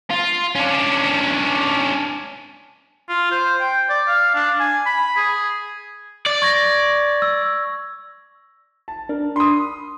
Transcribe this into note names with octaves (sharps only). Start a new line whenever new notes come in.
F4
C#4 D4
F4
C5
G5
D5
F5
D4
G#5
B5
G#4
D5
C#6 G#6 A#6
E6
A5
D4 A#4
B5 C6 D#6